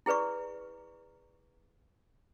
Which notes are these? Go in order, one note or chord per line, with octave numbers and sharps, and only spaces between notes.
E4 G#4 B4 D5 C#6